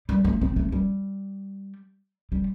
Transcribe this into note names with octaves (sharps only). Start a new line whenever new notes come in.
G3
A3
C4
A3
G3
G3